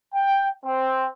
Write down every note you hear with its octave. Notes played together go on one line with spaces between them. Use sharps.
G5
C4